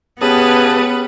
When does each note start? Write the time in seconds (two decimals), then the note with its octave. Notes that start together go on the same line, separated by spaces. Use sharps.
0.21 C#3 B3 G4 B4 A5 D#6